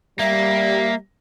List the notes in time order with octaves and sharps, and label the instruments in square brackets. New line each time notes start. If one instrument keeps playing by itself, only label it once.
[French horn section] G3 [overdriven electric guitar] A#3 [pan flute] E5